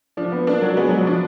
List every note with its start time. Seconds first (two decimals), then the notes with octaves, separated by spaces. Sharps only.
0.17 F3 D4
0.32 B3
0.47 A#3 D4
0.62 F#3
0.76 G#3 B3
0.89 F#3
1.01 F3
1.07 D4